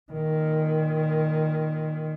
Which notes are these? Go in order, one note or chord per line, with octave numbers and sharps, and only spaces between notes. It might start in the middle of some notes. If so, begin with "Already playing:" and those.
A#2 D#3